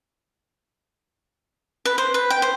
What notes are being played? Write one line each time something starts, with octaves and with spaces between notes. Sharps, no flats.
B4
C5
B4
G5
C5